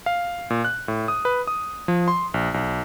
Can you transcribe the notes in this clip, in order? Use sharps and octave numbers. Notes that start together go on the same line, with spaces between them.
F5
A#2
F#6
A2
D#6
B4
D#6
F3
C6
A#1
B1